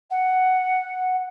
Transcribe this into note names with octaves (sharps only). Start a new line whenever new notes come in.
F#5